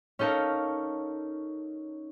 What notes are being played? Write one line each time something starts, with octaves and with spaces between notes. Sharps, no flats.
C#4 D#4 A4 A#4 F5